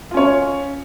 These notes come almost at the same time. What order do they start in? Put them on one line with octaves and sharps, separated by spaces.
F4 C#4 C#5